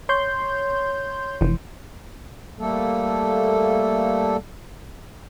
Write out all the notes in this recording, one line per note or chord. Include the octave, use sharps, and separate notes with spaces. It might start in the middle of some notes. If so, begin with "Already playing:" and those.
C#5 C6 G6
F1 E3
G3 A3 A#3 A4